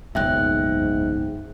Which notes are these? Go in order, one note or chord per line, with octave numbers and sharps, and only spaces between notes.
F#1 B1 F2 G#2 E5 G5 F#6